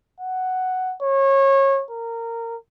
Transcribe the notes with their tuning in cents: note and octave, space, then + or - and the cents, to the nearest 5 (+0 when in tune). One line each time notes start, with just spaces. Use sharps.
F#5 +5
C#5 -25
A#4 -20